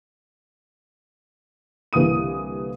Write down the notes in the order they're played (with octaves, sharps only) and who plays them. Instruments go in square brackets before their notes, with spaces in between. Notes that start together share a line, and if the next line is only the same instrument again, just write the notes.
[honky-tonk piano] C2 D3 E3 A#3 D#6 D#7